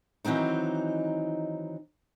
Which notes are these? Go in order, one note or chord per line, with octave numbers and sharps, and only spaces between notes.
D#3 E3 F#3 C4 D#4